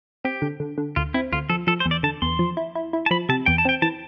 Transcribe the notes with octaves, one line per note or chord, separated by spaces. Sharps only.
C4 G4
D3
D3
D3
D2 F4
C4 E4
D2 F4
F3 A4
F3 A4
C5
E2
D5
D3 A5
E2 C6
F3
E4
E4
E4
A5
F3 B5
C3 A5
E2 G5
A5
C4 G5
E3 A5